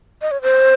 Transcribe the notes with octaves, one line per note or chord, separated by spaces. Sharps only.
D#5
C#5
C5